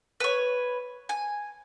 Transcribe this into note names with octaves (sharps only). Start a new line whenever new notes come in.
B4 C#5
G#5